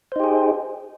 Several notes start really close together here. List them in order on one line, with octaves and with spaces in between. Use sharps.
C5 D#4 G4 G#4